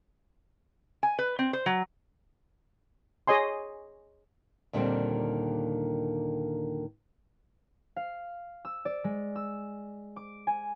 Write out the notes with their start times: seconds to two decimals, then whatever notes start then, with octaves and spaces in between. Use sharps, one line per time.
1.03 G#5
1.19 B4
1.39 C4
1.53 C5
1.66 F#3
3.27 G#4 C#5 D#5 G#5 C6
4.73 D#2 A#2 D3 D#3 G3 C4
7.96 F5
8.65 E6
8.85 D5
9.04 G#3
9.36 E6
10.16 D6
10.47 G#5